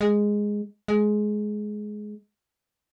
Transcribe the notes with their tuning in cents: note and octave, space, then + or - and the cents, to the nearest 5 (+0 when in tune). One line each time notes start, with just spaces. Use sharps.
G#3 -5
G#3 +15